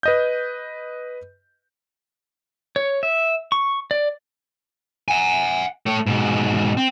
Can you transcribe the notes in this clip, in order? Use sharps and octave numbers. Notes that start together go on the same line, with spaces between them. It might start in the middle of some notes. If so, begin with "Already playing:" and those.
B4 D#5 G6
C#5
E5
C#6
D5
F#5 G#5
A3 C#5
G#2 B2
C4